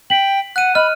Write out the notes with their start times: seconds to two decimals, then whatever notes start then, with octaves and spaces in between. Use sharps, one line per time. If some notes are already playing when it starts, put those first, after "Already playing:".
0.10 G5 B6 F#7
0.56 F#5 F#6 D#7
0.75 D#5 B5 F6